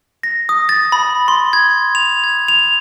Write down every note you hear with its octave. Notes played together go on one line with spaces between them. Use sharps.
A#6
D#6
A6
B5
C6
G#6
F7
G#6
F7